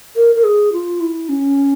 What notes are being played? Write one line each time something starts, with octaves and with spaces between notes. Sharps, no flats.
A#4
A#4
G#4
F4
E4
C#4